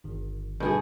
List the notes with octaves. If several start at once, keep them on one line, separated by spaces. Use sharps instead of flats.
G1 D#3
G2 B2 D3 G4 G#4